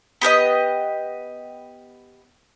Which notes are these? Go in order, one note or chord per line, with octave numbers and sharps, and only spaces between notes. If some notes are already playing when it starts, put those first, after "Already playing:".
B3 G4 A#4 D#5